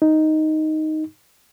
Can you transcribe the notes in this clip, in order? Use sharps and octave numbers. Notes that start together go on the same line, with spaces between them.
D#4